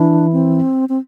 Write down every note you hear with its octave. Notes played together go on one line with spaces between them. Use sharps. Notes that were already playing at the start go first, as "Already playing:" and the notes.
Already playing: E3 D4 E4
C4
C4